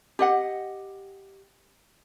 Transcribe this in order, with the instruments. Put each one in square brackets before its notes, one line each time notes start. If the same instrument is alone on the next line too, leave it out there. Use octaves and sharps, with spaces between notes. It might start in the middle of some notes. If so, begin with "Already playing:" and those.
[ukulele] G4 D#5 F#5